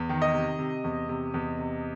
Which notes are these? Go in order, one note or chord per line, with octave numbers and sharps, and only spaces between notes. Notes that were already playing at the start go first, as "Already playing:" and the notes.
Already playing: E2
D#3
D#5
C3
C3
E2
C3
E2
C3